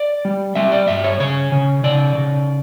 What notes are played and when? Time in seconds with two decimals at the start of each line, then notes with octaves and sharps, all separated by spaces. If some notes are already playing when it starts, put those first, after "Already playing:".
Already playing: D5
0.25 G3
0.55 G3 E5
0.72 D5
0.88 G2 E5
1.04 C#5
1.20 C#3 C#5
1.52 C#3
1.84 C#3 D5
2.15 C#3